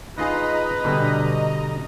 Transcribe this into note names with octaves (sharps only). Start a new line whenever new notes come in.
D#4 F4 G#4 B4 D#5 A#5
B2 D3 G3